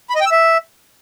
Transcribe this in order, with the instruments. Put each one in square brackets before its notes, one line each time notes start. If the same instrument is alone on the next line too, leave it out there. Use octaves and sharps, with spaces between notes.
[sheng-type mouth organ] B5
D#5
G5
E6
E5